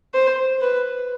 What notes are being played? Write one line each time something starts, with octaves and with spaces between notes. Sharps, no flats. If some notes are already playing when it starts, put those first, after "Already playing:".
C5
B4